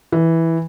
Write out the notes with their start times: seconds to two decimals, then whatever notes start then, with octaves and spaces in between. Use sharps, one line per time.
0.12 E3